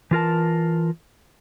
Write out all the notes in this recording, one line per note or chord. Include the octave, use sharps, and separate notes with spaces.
E3 F4 A#4 A5